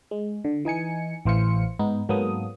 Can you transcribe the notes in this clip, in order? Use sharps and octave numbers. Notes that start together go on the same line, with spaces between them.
G#3
D3
E3 D#4 G#5 C#7
A1 E3 C5 F5 C#7
G#2 B3 D#4
G#2 F#3 A#3 B3 A4 D#6